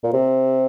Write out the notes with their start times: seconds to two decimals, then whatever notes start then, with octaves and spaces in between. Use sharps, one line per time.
0.03 A#2
0.13 C3